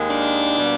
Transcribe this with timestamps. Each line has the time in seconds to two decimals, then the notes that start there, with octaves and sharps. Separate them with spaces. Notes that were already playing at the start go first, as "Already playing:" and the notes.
Already playing: D#2 D#3 G#3
0.09 D4
0.58 B2 G3 A#3